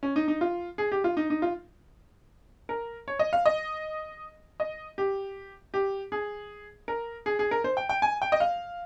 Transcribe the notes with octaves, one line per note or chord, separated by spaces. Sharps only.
C#4
D#4
D#4
F4
G#4
G4
F4
D#4
D#4
F4
A#4
C#5
D#5
F5
D#5
D#5
G4
G4
G#4
A#4
G#4
G#4
A#4
C5
G5
G5
G#5
G5
D#5
F5